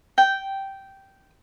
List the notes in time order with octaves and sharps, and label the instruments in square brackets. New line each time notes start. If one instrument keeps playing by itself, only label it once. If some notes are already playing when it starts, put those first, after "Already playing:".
[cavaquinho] G5